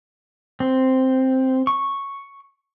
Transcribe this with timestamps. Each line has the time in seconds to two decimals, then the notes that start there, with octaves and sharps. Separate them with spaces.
0.60 C4
1.67 C#6